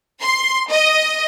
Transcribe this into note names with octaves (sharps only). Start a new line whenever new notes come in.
C6
D#5